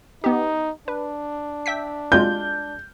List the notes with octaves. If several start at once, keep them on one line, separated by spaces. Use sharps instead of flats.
B3 D#4 G4
D4 B4
E5 G5 B6
G#3 F4 G6